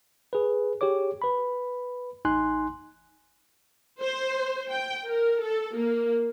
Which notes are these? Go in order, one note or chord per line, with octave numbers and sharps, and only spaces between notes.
G#4 B4
G4 G#4 C#5 D6
B4 B5
A1 D#4 G#5 C6 F#6
C5
G5
A#4
A4
A#3